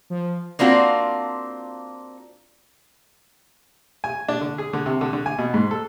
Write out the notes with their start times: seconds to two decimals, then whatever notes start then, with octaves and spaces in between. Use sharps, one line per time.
0.10 F3
0.59 A#3 C4 D4 F4 F#4
4.04 G#5
4.28 D4
4.41 D3
4.58 G#4
4.73 D3
4.86 C3
5.01 D3
5.13 D3
5.26 G#5
5.38 B2
5.54 G#2
5.71 A4